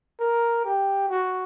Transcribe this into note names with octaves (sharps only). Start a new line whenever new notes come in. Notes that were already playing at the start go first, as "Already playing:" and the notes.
A#4
G4
F#4